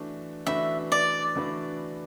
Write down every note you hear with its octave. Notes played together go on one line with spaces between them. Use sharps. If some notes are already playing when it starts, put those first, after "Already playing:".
Already playing: E3 A3 D4 F#4
E3 A3 D4 F#4 B4 E5
D5
E3 A3 D4 F#4 B4